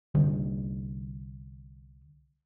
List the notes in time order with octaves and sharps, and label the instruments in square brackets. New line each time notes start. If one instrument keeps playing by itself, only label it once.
[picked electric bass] C2 D3 G3